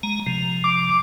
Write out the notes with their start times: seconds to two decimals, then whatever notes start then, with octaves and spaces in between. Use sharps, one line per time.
0.03 G#3 A#5
0.26 C3 F3
0.64 D6